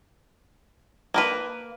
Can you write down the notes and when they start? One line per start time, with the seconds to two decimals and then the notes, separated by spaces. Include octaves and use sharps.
1.14 A#3 A#4 B4